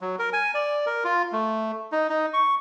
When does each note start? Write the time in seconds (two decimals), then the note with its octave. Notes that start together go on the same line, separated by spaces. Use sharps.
0.01 F#3
0.19 A#4
0.33 G#5
0.54 D5
0.86 A#4
1.04 F4
1.33 A3
1.92 D#4
2.09 D#4
2.34 C#6